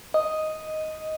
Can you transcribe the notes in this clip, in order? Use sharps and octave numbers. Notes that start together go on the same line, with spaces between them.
D#5